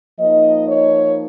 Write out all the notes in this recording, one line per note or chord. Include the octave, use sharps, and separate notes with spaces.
F3 A#3 D#4 D#5
C#5